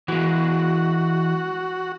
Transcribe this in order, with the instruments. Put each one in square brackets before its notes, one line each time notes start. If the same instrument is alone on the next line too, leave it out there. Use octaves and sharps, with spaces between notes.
[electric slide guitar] E3 G#3 [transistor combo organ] F#4